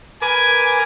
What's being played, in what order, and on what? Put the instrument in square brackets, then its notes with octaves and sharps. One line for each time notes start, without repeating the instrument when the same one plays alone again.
[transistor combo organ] A#4 B4 D6 [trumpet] G#5